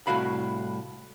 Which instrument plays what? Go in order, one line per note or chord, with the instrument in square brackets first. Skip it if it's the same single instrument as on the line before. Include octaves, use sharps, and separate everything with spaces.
[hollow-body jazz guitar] C2 F#2 A2 F#4 F5 B5